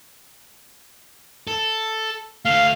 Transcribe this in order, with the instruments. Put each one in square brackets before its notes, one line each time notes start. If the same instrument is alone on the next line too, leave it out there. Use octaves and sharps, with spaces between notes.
[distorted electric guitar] A4
[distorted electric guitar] D3 A3 [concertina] F5